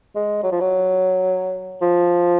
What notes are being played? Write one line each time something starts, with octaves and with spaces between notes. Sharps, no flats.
G#3
F#3
F3
F#3
F3